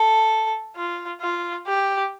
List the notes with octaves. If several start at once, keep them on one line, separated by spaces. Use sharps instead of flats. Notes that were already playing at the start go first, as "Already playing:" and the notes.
Already playing: A4
F4
F4
G4